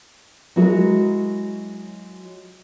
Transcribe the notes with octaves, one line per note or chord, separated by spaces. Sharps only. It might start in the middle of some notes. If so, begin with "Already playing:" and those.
F#3 G#3 E4 F#4 G#4 A#4